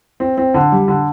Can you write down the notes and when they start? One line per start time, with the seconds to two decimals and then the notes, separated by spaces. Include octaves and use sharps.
0.20 C4
0.38 C4
0.54 D3
0.72 G3
0.88 D3